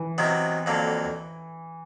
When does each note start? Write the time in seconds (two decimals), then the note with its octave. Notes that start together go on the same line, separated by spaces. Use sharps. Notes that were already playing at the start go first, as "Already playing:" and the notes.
Already playing: E3
0.18 C3 D#3 F#3 B3
0.66 F2 D3 F#3 A#3